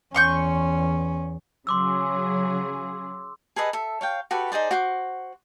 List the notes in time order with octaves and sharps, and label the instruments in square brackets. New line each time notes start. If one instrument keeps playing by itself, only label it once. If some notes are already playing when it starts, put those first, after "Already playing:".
[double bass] E2 [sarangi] C#4 [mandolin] C6 C#6 G6
[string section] C#3 F#3 G#4 [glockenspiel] C6 D6 E6
[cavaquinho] G#4 A4 B4 D#5
A4 E5
C#5 F5 G5
F#4 G4 A4 B4
D#4 G#4 C5 D5
F#4 C5 F#5 D6